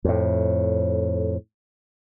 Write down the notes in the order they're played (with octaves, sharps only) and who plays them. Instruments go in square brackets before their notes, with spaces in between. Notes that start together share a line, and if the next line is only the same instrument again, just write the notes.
[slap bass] F2 A2